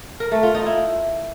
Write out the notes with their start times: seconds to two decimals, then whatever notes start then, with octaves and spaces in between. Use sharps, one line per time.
0.20 A#4
0.32 A3
0.43 F4
0.55 D#4
0.66 E4